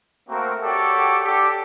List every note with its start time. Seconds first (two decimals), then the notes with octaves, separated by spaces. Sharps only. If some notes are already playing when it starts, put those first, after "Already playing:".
0.29 A3 A#3 C4 F#4 A#4
0.63 F#4 G4 A4 C#5 D5 G5
1.24 D4 G4 A4 D6